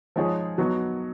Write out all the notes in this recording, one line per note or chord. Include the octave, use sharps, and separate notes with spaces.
F3 G#3 D#4 G#4 C#5
F#3 B3 D#4 F#4